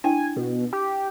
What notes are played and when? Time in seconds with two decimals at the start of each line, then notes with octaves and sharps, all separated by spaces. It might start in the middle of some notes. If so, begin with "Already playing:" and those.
0.04 D4 E4 G5 G#5
0.36 B2
0.73 G4